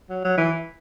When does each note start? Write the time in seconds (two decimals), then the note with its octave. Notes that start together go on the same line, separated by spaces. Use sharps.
0.09 F#3
0.24 F#3
0.37 E3